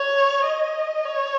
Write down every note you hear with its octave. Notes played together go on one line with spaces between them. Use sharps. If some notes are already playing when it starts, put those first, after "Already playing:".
Already playing: C#5
D#5
C#5